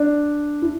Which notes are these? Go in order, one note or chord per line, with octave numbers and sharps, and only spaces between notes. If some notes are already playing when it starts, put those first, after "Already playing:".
Already playing: D4
E4